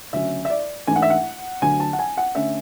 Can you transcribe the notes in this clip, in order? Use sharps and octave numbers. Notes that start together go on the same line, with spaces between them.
D2 C#3 F#3 C#4 E5
E5
D5
A1 G#2 E3 A3 D4 G#5
F#5
E5
F#5
D2 D3 F#3 G#5
A5
F#5
G#5
F#5
D3 A3 C#4 E5